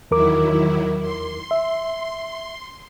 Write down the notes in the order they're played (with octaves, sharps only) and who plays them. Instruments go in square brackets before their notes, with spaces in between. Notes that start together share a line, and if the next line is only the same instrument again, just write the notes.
[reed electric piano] E2 A#4 D6 [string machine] D#3 F#3 E4
[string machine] C6
[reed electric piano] E5